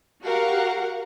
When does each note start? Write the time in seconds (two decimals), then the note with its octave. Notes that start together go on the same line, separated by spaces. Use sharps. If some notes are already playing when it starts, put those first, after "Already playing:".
0.24 F#4 G4 A#4 F5 F#5